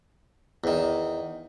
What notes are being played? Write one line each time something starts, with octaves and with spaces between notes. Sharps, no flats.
E2 D#3